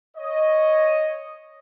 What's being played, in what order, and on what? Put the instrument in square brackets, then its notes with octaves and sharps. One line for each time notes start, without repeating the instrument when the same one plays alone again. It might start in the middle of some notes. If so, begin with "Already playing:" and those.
[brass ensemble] C#5 D#5